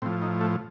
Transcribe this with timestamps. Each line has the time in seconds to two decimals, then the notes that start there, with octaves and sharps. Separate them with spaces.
0.02 A2 C4
0.06 F3
0.22 D#4
0.41 A3